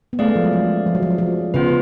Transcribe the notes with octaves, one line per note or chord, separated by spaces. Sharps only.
B3
A3 C#4 G#4 D5 F5
G#3
F3
F#3
F3
F3
F#3
F3
F#3
F3
C#3 B3 F4 B4